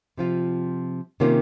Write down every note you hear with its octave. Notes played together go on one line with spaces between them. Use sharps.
C3 F3 C4 F4
C3 D#3 A#3 C#4 F4